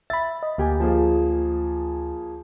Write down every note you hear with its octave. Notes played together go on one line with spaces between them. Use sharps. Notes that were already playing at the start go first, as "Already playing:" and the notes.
E5 B5 A6
D#5
D2 A#3 G4 G#5
F3 A#3 G#4